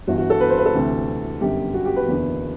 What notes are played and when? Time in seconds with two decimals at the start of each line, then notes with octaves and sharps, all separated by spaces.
0.07 G1 G2 E3 F#4
0.18 F#4
0.30 A4
0.40 B4
0.49 C5
0.58 B4
0.66 A4
0.74 D2 C3 E3
1.41 G1 F#2 D3 G4
1.74 F#4
1.85 G4
1.96 B4
2.08 F#1 E2 D3